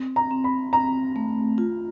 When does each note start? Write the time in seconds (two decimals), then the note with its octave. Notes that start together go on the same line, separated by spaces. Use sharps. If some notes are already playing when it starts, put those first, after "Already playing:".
Already playing: C4
0.16 A#5
0.31 C4
0.44 B5
0.73 C4 A#5
1.16 A3
1.58 F4